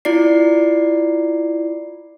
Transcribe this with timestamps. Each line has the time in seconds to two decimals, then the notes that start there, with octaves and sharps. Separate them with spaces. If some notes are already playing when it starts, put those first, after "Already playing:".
0.05 E4 F4 D5 C7